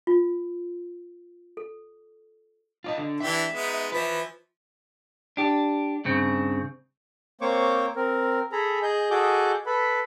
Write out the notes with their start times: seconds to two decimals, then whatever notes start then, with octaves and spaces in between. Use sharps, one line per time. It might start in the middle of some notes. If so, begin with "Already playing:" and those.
0.07 F4
1.57 A4
2.84 F4 D5 D#5
2.97 D3
3.20 E3 D4 G4 E5
3.51 G#3 B3 D#4
3.92 F3 B4 E5
5.37 D4 G4
6.05 G2 C#3 C4
7.41 A#3 C4 C5 C#5 C#6 D6
7.96 C4 A#4
8.52 G#4 A4 A#5 B5
8.83 G#4 D#5 G6
9.11 F#4 G#4 A4 D#5 D6 G6
9.66 A4 B4 B5